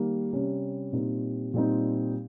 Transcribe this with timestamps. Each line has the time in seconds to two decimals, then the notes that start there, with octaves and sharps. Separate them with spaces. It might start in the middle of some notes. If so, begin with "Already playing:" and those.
Already playing: D#3 G3 A#3
0.32 C3 G3 C#4
0.93 A#2 G3 C4 D#4
1.54 A#2 G3 C4 D#4